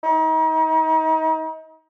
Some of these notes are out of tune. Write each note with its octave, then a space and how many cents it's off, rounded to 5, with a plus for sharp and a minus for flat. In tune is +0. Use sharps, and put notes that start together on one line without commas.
D#4 +35